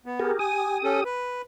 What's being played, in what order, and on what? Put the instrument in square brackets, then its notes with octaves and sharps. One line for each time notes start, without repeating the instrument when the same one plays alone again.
[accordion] B3
[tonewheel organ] G4 G#4 A#4
[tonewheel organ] G4 D#6 [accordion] G#5
[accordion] C#4 A4
B4